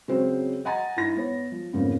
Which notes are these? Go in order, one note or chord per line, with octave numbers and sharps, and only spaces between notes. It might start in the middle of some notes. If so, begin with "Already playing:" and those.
C#3 F#3 G#3 C4 C#4 C5
D#5 F#5 G#5 A#5 A6
G2 D#4 E4 A#6
B3 C#5
F3
F2 G#2 C#3 F3 A#3 B3